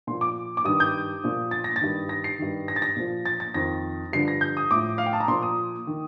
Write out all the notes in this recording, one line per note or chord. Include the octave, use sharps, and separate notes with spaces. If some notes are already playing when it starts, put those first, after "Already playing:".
A#2 F3 C6
D6
D6
G2 D#3 D#6
G6
A#2 F3
A6
A#6
A6
G2 D#3
A#6
C7
G2 D#3
A#6
A6
A#6
A#2 F3
A6
A6
F2 D#3 A#6
G2 D3 F3 C7
A#6
G6
D#6
A2 F3 D6
F5
G5
A5
A#5
A#2 F3 C6
D#6
D#3